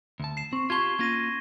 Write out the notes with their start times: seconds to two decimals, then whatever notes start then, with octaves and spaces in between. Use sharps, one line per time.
0.20 D2 A5
0.37 C7 E7
0.53 C4 C#6
0.70 F4 G4 A5 C6 C#6 G#6 G7
0.99 A#3 C#4 F4 G#6 A#6 D#7